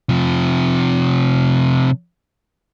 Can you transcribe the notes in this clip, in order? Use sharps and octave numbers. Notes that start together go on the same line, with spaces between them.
C3 F3